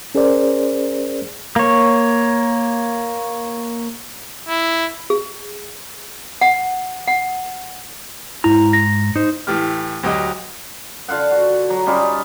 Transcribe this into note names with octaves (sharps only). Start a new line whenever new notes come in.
C#4 G#4 A#4 C5 D5
A#3 C#5
E4
G#4
F#5
F#5
G#2 E4 A#5
A#6
D#4 C5
A2 E3 G4 F6
D2 F#3 G4 D#5
D3 F4 F5 F#5
F#4
F#3
G3 C#4 D#4 F4